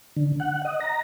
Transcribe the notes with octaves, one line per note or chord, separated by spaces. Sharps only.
D3
F#5
D#5
A#5